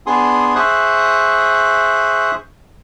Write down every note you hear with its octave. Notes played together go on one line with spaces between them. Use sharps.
B3 D4 G#4 G#5 C6 D#6
G#4 C5 E5 C#6 D#6 F#6